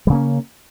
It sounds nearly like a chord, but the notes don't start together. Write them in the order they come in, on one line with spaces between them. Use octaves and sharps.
G3 C#3 A#3 C#4